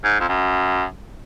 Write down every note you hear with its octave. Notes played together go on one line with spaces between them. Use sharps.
G#2
F2
F#2